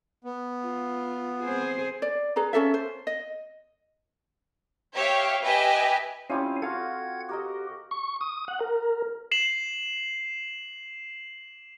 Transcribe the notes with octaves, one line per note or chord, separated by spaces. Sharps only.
B3
F4
C4 G#4 C5
D5
G#4 B4 A#5
C#4 G#4 A4 E5
C5
D#5
G4 C#5 E5 F5
G4 B4 D#5 E5 G#5
F3 G3 C4 C#4 E4 C#5 F5 G#5
F4 F#4 A4 F5 F#5 G#6
F#4 G4 A#4 D#5
C#6
D#6
F#5
A#4
C7 E7 F#7